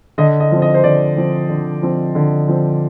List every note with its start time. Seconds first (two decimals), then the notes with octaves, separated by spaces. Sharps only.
0.18 D3 D#5
0.40 D#5
0.51 F3 C4
0.62 D#5
0.74 C5
0.84 D3 D5
1.17 F3 C4
1.49 D3
1.82 F3 C4
2.15 D3
2.48 F3 C4